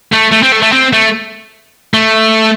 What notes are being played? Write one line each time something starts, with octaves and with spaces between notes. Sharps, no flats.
A3
A3
C4
A3
A3
C4
A3
A3